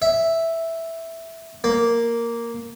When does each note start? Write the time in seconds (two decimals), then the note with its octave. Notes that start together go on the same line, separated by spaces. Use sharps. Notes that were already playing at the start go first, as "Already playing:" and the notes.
0.02 E5
1.64 A#3